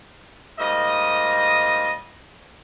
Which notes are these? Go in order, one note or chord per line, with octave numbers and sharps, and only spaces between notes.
G#2 G3 A#3 D#5